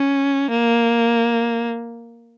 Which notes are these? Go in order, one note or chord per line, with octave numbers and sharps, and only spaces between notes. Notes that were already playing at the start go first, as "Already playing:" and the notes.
Already playing: C#4
A#3